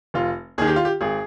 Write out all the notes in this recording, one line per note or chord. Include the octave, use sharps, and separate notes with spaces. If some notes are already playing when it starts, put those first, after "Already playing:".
F1 F4
D#2 D#3 G#4
G4
F4
G4
G#1 G#4